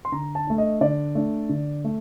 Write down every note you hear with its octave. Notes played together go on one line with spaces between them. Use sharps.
C6
D3 A#5
A5
A3 D4
D#5
D3 D5
A3 D4
D3
A3